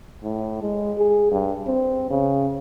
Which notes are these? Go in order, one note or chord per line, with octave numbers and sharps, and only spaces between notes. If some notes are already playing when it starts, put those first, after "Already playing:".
A2
G#3
G#4
G2
C4
C#3